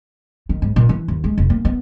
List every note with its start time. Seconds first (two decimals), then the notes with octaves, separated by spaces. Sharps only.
0.49 D#3
0.62 G#2
0.76 A#2
0.89 E3
1.08 D#2
1.24 G#3
1.38 F1
1.50 A#3
1.65 B3